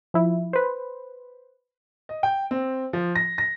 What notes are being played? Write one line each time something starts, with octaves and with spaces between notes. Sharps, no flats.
F3 E4
B4 C5
D#5
G5
C4
F3
A#6
A#6